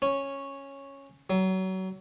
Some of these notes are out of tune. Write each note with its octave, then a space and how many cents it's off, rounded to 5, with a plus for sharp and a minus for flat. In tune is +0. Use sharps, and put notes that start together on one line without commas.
C#4 -5
F#3 +30